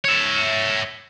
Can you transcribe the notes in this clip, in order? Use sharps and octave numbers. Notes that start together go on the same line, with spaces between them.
C#5 E5